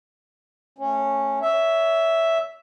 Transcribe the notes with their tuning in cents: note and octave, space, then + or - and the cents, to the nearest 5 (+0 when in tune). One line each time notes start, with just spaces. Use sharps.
A3 +5 C#4 -10
C#5 +25 E5 +0